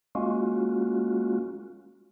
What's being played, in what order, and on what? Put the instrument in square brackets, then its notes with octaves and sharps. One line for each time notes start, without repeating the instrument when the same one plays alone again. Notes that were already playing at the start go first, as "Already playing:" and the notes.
[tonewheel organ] G#3 A#3 C#4 F4 F#4